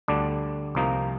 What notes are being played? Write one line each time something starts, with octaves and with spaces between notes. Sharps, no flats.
D2 D3 G3 D4
C2 C3 F3 A#3 D#4